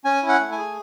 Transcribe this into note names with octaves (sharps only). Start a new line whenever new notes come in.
C#4 G#5
E4
F#5
A3
G#5
G#4